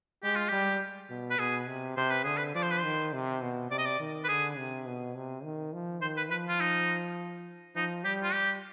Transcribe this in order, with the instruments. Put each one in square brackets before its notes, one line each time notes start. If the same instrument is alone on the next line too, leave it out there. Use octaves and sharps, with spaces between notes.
[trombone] G#3 [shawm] G4
[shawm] F4
[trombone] G3 [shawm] G4
[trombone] B2
[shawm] B4
[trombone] B2 [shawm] G#4
[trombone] C3
[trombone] C3 [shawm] C5
[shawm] B4
[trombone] D3 [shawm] G#4
[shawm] B4
[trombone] F3 [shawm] D5
[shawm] C5
B4
[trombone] D#3 [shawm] C5
[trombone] C3
B2
[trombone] C3 [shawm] D5
[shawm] D#5
D5
[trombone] D#3
[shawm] B4
[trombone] D3 [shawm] G#4
[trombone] C3
B2
C3
D#3
F3
[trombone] D#3 [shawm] C5
[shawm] B4
[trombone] F3 [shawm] B4
[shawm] F4
D#4
[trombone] F3 [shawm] D#4
[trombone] G3 [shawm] G4
[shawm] F4
[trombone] G3 [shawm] G4